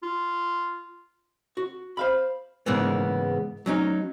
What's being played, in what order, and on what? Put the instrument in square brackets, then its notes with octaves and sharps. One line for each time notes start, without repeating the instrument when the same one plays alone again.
[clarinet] F4
[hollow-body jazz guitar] F#4
C5 F5 B5
G#2 C#3 E3 G#3 A#3 B3
F#3 C#4 D#4